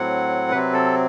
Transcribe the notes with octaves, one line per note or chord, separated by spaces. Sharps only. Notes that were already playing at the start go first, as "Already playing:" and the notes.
Already playing: A2 F#3 C4 F#5
C3 F#3 C4 B4
A4